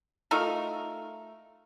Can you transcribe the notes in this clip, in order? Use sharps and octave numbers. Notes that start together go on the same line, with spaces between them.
A3 D#4 F4 A#4